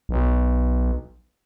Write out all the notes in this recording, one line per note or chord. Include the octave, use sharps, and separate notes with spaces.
B1